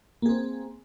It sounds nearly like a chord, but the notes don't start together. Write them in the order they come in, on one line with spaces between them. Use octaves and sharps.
A#3 G#4 C4